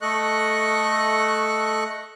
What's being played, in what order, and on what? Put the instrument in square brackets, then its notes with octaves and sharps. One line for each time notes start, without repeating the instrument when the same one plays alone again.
[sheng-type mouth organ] A3 A4 D#5 C#6 F#6